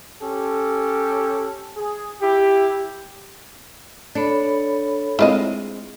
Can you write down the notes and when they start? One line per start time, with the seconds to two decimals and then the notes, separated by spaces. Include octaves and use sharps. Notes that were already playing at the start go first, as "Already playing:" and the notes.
0.21 C#4 G4 A4
1.76 G#4
2.21 E4 G4
4.15 D4 A4 C#5 B5
5.19 G#3 C4 E4 F4 D#5